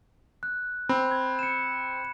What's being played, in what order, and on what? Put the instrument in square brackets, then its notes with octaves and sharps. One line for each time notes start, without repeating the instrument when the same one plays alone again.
[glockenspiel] F#6
[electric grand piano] C4 [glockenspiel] B5
[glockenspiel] G#6
C#7 E7